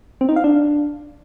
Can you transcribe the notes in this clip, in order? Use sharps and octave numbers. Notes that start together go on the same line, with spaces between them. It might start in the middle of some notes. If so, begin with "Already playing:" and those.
C4
D#4
F5
D4